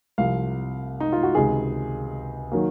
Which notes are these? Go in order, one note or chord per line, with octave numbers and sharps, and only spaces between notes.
C2 C3 F3 F5
D#4
F4
F#4
C#2 C3 D#3 G#4
D#3 F#3 A#3